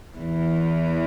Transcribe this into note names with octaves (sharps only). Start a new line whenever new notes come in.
E2 E3